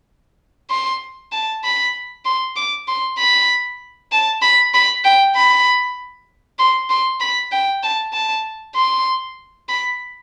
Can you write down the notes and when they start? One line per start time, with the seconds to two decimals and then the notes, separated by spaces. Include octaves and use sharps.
0.70 C6
1.32 A5
1.64 B5
2.25 C6
2.56 D6
2.88 C6
3.18 B5
4.12 A5
4.42 B5
4.74 B5
5.05 G5
5.36 B5
6.59 C6
6.90 C6
7.20 B5
7.52 G5
7.83 A5
8.13 A5
8.76 C6
9.69 B5